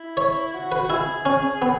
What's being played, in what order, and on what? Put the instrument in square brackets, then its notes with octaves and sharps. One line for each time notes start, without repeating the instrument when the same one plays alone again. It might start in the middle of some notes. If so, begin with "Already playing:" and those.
Already playing: [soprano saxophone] E4
[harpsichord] C#5
[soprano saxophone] F#4
[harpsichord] B4
[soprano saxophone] F#4
[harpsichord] E4 [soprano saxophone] G#4
[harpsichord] C#4
B3